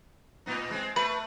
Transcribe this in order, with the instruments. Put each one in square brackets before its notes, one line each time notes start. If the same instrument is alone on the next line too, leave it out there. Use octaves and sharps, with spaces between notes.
[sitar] A2 B3 D#4
G#3 C4
[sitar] A3 [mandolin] B4